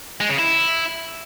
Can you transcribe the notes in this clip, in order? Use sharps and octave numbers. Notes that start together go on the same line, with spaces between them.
G#3
C#3
E4